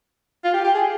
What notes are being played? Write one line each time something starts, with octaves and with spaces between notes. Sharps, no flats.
F4
G4
G4
G#4